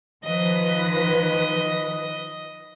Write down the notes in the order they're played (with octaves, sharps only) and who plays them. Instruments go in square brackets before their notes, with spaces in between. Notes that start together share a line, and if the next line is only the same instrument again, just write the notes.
[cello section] D#3 F3 B4 [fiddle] D#5